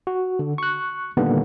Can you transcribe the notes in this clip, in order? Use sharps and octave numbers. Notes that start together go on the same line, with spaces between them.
F#4
D3
C#6 F#6
A#2 D3 D#3 G3 A#3 B3